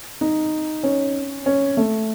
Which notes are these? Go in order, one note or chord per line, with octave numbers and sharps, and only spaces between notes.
D#4
C#4
C#4
A3